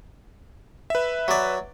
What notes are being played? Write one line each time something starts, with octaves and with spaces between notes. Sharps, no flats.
B4 E5
F#3 D5